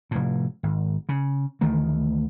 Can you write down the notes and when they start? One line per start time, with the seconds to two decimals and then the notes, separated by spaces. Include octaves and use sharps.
0.11 F1 A2
0.63 G#1
1.09 C#3
1.61 D2 D#3 E3 A3